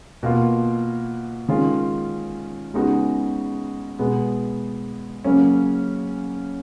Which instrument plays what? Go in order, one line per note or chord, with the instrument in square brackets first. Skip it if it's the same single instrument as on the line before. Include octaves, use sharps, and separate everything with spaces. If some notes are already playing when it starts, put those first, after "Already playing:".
[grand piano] B2 A#3 F4
D#3 G#3 C#4 F4
C#3 G#3 B3 D#4 F#4
B2 G#3 B3
C#3 F#3 A#3 C#4